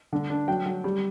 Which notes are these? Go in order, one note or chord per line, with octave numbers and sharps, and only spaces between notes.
D3
D4
F#3 G5
F#3
G3